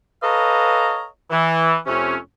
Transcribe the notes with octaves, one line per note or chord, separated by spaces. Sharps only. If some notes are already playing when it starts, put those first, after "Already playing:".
A4 B4 C#5 D#5 F5 A#5
E3
F2 C3 A3 C#4